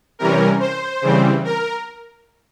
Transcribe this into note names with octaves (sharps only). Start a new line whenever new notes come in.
C3 E3 G3 C#4 A#4
C5
C#3 E3 G3 C4
A#4